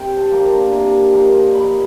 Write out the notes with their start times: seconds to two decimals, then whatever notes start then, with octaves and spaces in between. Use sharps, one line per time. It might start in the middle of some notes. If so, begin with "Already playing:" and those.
Already playing: C3 G5
0.17 A5
0.31 F3 A#3 D4
0.45 A#5
0.72 C3 G#5
1.13 F3 A#3 D#4
1.55 A#2 B5